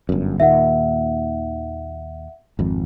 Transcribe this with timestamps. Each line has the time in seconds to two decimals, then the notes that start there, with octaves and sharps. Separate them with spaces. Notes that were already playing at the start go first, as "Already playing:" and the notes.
0.09 G1 F#2
0.40 D#2 A#2 D#3 E5 F#5
2.59 G#1 F2